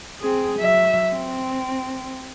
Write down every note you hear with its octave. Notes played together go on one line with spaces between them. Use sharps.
C4 G#4
F#3 E5
C4